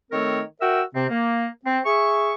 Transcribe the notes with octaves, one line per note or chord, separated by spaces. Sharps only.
D#3 A3 C4 A4 A#4 C#5
F#4 A#4 E5 G5 E6
C3 C4
A#3
C4
G#4 E5 C#6